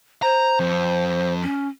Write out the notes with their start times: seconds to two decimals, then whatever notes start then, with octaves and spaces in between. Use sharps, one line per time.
0.22 C5 A#5
0.60 F2
1.42 C#4